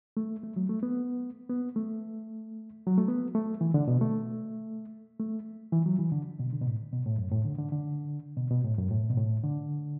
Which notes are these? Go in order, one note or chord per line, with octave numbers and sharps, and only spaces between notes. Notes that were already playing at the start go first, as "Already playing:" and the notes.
A3
A3
F#3
A3
B3
B3
A3
F#3
A3
B3
A3
E3
D3
B2
A3
A3
E3
F#3
E3
D3
B2
D3
B2
A2
B2
A2
F#2
A2
D3
D3
D3
B2
B2
A2
F#2
A2
B2
A2
D3